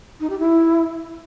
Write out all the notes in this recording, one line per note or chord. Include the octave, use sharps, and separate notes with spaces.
D#4
G4
E4